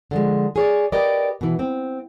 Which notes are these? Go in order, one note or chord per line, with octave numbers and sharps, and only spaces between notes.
D3 F3 G#3
G#4 C#5 D5
G4 A#4 B4 D5 D#5
B2 E3
C4